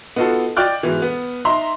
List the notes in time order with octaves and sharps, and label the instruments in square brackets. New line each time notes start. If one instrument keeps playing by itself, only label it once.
[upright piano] B3 D#4 F4 F#4 A4
D5 D#5 G5 D6 F6 F#6
G#2 B2 E3
B3
D#4 E5 A#5 C6